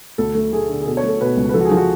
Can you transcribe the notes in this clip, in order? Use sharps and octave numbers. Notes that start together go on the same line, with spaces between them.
D2 A4
A3
A3 G#4
D3
G#4
B2 A4
C#5
A3 A4
B2 B4
C#2
B4
F3 A4
F#4
G#4
F3
F#4